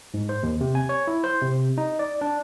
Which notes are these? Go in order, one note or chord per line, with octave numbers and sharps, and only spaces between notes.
G#2
C5
D#2
C3
G#5
C#5
E4
C5
C3
D#4
D5
D4